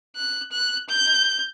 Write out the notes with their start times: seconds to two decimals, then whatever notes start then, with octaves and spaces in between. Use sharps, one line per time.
0.16 F#6
0.52 F#6
0.89 G6